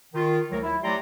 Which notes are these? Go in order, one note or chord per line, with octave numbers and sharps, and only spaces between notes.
D#3 F4
D2 F#3 A#4
E4
F#3 A3 G4 D5 A#5 C6